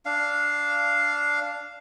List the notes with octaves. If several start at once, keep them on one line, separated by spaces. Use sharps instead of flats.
D4 F5